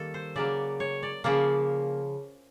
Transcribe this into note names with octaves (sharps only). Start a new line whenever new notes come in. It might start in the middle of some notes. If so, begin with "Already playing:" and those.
Already playing: D#3 G3 A#3 A4
C5
C#3 F#3 A#3 D5
C#5
D5
C#3 F3 A#3 D5